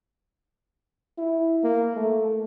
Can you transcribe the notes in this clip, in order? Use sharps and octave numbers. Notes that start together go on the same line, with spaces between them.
E4
A#3
A3